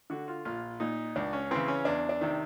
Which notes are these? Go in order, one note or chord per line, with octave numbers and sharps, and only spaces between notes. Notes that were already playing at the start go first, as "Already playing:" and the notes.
D3 F#4
F4
A#1 F4
A#2 D#4
C#2 D4
C#4
C#3 E3 C4
C#4
E2 D4
D4
C3 D#3